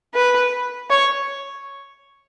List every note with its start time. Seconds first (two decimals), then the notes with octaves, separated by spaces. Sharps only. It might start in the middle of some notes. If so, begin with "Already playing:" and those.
0.14 B4
0.90 C#5